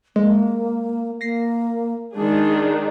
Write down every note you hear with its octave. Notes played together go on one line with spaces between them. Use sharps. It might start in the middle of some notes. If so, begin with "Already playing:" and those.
G#3 A#3
A#3 A#6 C7
D#3 G#3 D4 G#4